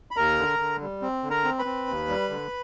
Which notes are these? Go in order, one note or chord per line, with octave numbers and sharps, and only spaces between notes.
B5
D#2 A#4 A#5
D3
D3
G3
C4
D3
A#4 A#5
C4
B4 B5
C4
D#2
G3
D3